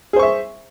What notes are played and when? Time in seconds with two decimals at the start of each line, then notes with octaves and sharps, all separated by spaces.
0.13 G#4
0.16 C5
0.19 C#6
0.22 E5